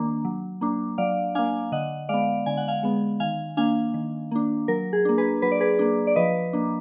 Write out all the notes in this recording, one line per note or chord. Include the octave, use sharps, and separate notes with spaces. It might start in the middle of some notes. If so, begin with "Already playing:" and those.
Already playing: D#3 A#3 D4
F#3
A#3 D4
F#3 D5 F5
A#3 D4 F5 G#5
D3 D#5 F#5
G#3 B3 D5 F5
D3 G#5
F#5
F5 G#5
G#3 B3
D#3 F5 G#5
A#3 D4 F5 G#5
D#3
A#3 D4
F#3 A#4
G#4
A#3 D4
G#4 B4
F#3 B4
D5
G#4 B4
A#3 D4
D5
F3 B4 D#5
A#3 D4